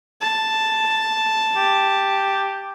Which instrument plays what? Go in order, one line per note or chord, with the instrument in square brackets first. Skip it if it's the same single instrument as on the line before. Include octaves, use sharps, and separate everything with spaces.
[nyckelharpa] A5
[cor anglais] G4